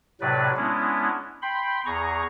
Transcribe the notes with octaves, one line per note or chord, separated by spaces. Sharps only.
A2 C3 F#3 B4 D5
G#3 B3 C#4 D4 E4
G5 B5 C6
E2 G#4 A#5 C#6